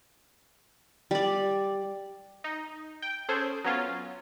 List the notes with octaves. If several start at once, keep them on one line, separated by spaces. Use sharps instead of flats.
G3 D5
D#4
G5
C#4 G#4 A4 C5
F#3 B3 C#4 F4